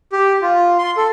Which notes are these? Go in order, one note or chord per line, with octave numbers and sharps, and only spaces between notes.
G4
F4
C6
A4